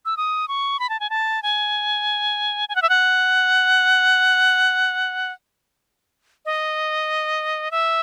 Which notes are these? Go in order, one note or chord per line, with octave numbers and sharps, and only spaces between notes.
E6
D#6
C#6
B5
A5
G#5
A5
G#5
G#5
F#5
E5
F#5
D#5
E5